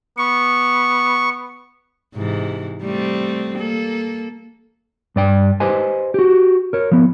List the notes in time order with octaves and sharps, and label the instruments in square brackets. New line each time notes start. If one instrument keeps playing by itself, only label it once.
[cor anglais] B3 [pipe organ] C#6
[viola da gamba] G#2 C3 E3
G3 A3 C4
A#3 A4
[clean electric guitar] G2 D5 G5
G4 B4 C5 D#5 G#5
F#4 G4
A#4 C#5
F3 B3